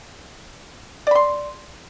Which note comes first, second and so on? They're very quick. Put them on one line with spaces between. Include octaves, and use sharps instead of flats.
D5 B5 C6